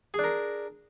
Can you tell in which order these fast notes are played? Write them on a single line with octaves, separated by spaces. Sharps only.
G#4 D4 A#4